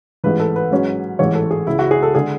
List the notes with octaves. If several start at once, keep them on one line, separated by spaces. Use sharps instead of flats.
A1 G#2 E3 B4
A4
B4
G#2 F#3 C#4
A1 G#2 E3 C#5
A4
G#4
C#2 C#3 G#3 E4
F#4
G#4
A4
D3 G#3 G#4